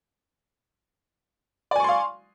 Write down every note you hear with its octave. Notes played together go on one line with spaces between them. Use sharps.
D5 F5 G#5 C6 C#6